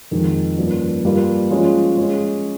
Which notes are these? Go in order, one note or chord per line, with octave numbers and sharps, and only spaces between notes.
F2 D#3 G#3 D#4 G#4
G2 F3 A#3 C#4
G2 G3 A#3 F4 A#4
F3 G#3 C#4 F4 G#4
G#3 C#4 G#4